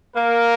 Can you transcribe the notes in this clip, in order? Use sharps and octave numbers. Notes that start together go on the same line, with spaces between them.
A#3 A#4